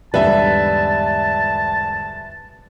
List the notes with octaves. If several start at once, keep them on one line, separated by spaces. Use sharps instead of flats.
E2 G#2 D3 G3 B4 E5 A5